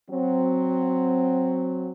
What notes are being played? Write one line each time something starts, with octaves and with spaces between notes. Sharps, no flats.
F#3 C4